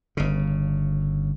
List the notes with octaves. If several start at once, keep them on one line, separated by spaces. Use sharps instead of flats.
G1 C#3